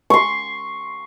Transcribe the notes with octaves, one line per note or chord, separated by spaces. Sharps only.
C6 C#6